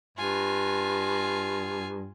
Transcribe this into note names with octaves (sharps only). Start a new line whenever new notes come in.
G2 F4 G#5